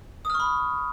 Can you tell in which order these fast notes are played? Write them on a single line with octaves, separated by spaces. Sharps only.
D#6 F6 C#6 B5